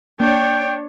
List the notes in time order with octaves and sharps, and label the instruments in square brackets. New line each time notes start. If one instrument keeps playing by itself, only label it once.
[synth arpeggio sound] A#3 [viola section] D4 C#5 [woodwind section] G5